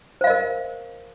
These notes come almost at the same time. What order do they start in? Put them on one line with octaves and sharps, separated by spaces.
C5 F5 D#5 A#4